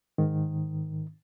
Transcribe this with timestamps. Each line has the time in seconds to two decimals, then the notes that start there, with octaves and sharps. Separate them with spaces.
0.18 G#2 D#3